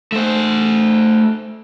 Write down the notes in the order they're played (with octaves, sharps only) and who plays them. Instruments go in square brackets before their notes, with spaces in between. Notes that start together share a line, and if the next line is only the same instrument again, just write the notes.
[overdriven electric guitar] A3 C5